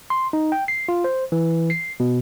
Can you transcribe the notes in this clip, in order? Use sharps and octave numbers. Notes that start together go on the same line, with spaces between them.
C6
D#4
G5
C7
F4
C5
E3
C7
B2